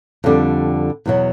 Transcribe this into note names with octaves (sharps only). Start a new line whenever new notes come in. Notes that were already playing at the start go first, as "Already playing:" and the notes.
F2 D3 G3
E2 B2 F#3 B3